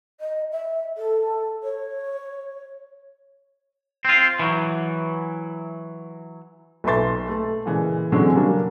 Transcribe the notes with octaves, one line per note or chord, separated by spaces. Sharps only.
D#5
E5
A4
C#5
C4 F4
E3 F#3
B1 A4 B4 E5 C6 A6
A3 A4
A#2 C#3 E3 G#3
D3 E3 F#3 G#3 C4 C#4
C#3 F#3 G3 A#3 D4